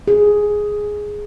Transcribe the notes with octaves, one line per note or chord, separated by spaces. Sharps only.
G#4